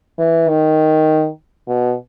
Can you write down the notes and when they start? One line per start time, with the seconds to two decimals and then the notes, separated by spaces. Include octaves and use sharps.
0.19 E3
0.48 D#3
1.67 B2